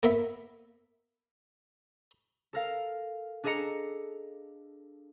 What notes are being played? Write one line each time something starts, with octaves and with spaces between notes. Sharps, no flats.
A#3 B3 E5
A4 A#4 F5
D4 G#4 A4 D#5 A#5 C#7